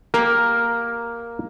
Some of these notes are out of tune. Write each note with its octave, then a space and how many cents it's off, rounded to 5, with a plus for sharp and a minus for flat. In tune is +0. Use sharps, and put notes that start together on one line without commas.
A#3 +0 G4 +0 A#4 +0